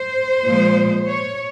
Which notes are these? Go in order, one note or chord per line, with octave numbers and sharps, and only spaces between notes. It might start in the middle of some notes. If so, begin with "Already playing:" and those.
Already playing: C5
A#2 F3 G#3
C#5